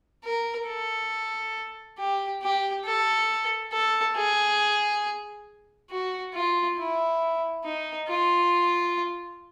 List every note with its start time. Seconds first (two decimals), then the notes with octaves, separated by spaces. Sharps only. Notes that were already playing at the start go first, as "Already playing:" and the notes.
0.24 A#4
0.67 A4
1.98 G4
2.42 G4
2.85 A4
3.72 A4
4.16 G#4
5.90 F#4
6.34 F4
6.78 E4
7.65 D#4
8.08 F4